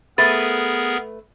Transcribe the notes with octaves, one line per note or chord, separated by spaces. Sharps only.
A3 B3 G#4 A#4 B4 A6